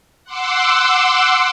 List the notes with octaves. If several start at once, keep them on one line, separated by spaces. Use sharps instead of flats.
F#5 C6 D6 E6